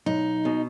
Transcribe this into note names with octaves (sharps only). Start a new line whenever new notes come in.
B1 D#4
B2